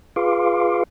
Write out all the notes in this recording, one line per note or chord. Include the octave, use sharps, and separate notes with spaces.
F4 G#4 B4 F5 C6 D6